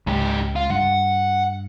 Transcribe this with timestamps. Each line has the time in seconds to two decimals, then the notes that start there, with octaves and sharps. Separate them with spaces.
0.07 C#2 G#2 G4
0.56 F4
0.70 G2 F#5